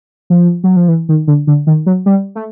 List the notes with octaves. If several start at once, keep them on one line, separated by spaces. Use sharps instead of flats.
F3
F#3
F3
E3
D#3
D3
D3
D#3
F#3
G3
A3